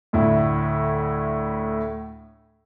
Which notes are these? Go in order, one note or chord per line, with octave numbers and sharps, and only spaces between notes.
D2 A2 E4